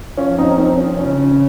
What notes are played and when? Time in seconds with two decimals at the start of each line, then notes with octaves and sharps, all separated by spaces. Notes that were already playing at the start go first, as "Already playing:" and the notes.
0.17 F3 C#4 F4
0.38 C4 D#4
0.51 C#4
0.57 C4 D#4
0.78 C#4 F4
0.97 C#3 C#4